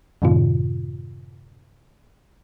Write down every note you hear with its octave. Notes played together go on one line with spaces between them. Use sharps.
F#2 A2 C3 D#3 F4